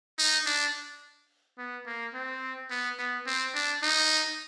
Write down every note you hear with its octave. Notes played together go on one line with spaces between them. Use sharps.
D#4
D4
B3
A#3
C4
B3
B3
C4
D4
D#4